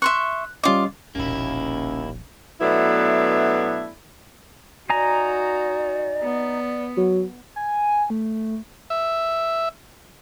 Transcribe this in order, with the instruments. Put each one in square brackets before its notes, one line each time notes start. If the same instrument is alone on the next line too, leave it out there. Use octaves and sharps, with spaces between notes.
[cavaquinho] E5 C6 C#6 [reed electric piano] F#6
[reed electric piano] G3 C#4 D#5 [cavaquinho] F4 D6
[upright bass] E1 A#1 [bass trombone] D#2 [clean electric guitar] A#3 E4 [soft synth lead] C#4
[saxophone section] B2 F#3 A3 B3 D4 E4
[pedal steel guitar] D#4 G#5 A#5 [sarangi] F#4 [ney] D5
[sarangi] B3
[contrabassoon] F#3
[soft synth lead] G#5
A3
[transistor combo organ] E5